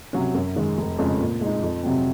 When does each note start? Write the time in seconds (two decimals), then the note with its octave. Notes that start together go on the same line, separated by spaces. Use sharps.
0.13 C3 F#3 C#4
0.35 F#2
0.56 D#3 G#3
0.78 F1
0.98 F2 C#3 G#3
1.20 A#2
1.41 G#3 D#4
1.63 F2
1.83 C3 F#3 C4